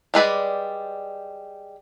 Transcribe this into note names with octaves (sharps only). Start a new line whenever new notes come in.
G3 G#3 B4 D5